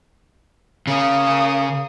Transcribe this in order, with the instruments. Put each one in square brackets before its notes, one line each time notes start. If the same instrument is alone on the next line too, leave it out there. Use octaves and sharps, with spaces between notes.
[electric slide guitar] C#3 C#4 [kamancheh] A#3 D#6